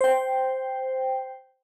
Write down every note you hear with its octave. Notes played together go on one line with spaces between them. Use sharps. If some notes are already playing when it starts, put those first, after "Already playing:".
C5 G5